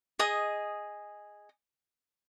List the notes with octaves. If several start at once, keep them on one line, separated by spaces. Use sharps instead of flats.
G#4 D#5 D#6